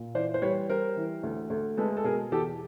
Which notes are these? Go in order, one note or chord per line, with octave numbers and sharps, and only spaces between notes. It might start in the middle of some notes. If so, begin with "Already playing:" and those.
Already playing: A#2
E3 C5 D5
C5
G3 B4 C#5
G3 A#4 C5
E3
D2
D2
G#3 A4 B4
A4
B2 G#4 A#4
E2 G4 A4